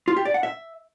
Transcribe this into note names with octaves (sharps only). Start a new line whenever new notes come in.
F4
G4
D5
F#5
E5